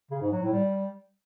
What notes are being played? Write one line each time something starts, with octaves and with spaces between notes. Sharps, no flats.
C#3
G#2
F#3
A2
G3